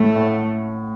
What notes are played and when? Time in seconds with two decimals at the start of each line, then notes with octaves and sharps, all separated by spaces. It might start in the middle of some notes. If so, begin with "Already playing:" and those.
Already playing: A2 A3
0.16 A2